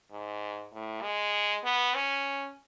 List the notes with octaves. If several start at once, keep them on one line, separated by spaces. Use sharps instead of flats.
G#2
A2
G#3
B3
C#4